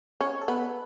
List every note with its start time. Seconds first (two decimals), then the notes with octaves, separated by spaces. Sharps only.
0.21 C#4 C#5
0.41 A4
0.48 B3 B4